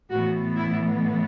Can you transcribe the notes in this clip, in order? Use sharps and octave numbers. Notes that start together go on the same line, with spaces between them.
A2 E3 B3 F#4
E4